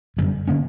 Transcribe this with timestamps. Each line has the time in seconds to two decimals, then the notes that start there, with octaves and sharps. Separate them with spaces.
0.17 G1 F#2 D3 G3
0.48 D3 A#3 C#4